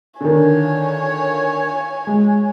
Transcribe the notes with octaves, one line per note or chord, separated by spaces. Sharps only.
D3 D#3 C#5 G#5
G#3